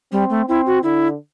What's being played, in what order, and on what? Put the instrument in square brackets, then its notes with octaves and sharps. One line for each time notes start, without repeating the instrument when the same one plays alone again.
[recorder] G3 [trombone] C4
[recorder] A3
[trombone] C4 [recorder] E4
[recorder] F#4
[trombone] D3 [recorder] E4